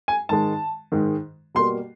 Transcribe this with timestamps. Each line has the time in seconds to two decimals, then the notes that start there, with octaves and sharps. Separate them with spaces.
0.08 G#5
0.29 G#2 D#3 G#3 A5
0.92 G#2 D#3 G#3
1.55 B2 G3 A#3 C6